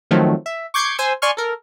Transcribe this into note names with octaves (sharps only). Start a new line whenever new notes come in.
D#3 F3 F#3 A3 C4
E5
C#6 D6 G6 G#6 C7 C#7
C5 G#5 C6 E6
D5 G#5 C6 C#6 F6
A4 A#4